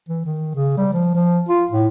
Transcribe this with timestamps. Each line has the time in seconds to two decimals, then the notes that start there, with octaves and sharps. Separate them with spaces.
0.09 E3
0.26 D#3
0.55 C#3
0.77 G3
0.93 F3
1.15 F3
1.49 F4
1.71 A2